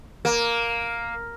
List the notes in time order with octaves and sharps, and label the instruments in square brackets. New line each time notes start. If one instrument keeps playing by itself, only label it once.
[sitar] A#3